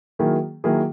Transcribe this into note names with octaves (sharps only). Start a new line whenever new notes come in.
D#3 F#3 A#3 E4 G#4
D#3 F#3 A#3 E4 G#4